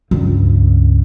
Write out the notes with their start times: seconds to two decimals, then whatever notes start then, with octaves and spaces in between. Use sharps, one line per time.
0.11 C#2 G2